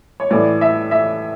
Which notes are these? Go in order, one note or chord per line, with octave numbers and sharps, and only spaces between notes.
C#5
A2 E3 D5
E5
E5